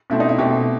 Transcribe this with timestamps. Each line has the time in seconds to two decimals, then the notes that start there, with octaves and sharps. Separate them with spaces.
0.10 B2 A3 C4 E4
0.20 D#4
0.29 E4
0.38 B2 A3 C4 G4